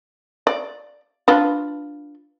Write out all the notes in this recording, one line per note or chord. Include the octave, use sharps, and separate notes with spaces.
D5
D4 F4 B4